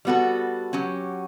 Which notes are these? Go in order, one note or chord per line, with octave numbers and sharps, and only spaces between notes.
G3 B3 F#4 A4
F#3 C#4 G4